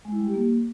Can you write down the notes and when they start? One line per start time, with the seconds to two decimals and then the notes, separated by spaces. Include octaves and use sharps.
0.05 G#3
0.12 E4
0.19 G3
0.27 G4
0.34 A#3